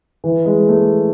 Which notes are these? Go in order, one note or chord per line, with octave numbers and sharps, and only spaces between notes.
E3
G#3
A3